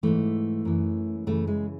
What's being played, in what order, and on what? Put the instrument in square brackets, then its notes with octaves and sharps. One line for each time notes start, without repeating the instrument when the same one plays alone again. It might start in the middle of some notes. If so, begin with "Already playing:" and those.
[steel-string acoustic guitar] G#2 E3 A3
F#2 E3
F#2 C#3 E3 A3
G#3